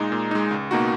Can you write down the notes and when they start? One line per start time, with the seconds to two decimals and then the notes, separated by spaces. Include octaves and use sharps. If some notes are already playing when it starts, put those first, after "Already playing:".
Already playing: A#2 G#3 D#4
0.12 A#2
0.31 G#3 D#4
0.51 C#2
0.71 B2 A#3 D#4 F#4